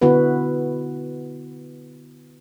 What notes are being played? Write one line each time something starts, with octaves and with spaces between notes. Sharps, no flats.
D3 B3 E4 F#4 B4